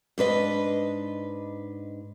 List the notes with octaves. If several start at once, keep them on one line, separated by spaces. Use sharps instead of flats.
G#2 D4 B4 D#5